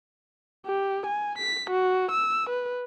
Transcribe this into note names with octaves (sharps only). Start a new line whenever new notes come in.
G4
G#5
B6
F#4
E6
B4